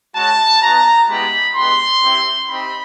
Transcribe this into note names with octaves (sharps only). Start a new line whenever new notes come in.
G#3 C#4 F#4 A5
B3 D#4 F#4 A#5
G#3 B3 E4 G4 B5
G#3 B3 D4 G4 C6
C4 E4 G4
C4 D#4 G4 B5